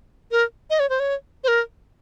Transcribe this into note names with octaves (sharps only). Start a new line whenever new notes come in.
A#4
D#5
C#5
C5
C#5
C5
A#4